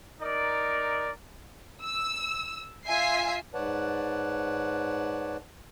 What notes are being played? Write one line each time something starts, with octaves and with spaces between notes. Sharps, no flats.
D#4 A#4 D5
E6
F4 E5 G#5 C7
G#2 B4 C#5 D5 F#5 A5